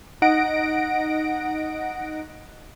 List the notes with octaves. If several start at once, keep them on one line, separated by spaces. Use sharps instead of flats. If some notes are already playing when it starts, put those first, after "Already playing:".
D#4 D#5 F#5 A#6 D7